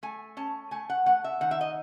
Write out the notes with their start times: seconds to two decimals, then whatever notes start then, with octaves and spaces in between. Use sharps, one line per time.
0.03 A3 G#5
0.37 C#4 A5
0.71 A3 G#5
0.90 F#5
1.06 A3 F#5
1.24 E5
1.41 D#3 F#5
1.51 E5
1.61 D#5